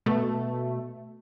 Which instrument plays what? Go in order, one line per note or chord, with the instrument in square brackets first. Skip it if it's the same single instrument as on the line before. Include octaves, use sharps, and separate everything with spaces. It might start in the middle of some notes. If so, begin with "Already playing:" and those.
[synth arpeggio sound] B2 A3